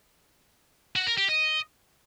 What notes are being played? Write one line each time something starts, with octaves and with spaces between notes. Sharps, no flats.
F#4
A#4
G4
D#5